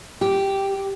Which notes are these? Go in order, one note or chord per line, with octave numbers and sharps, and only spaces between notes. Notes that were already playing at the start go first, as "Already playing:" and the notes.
G4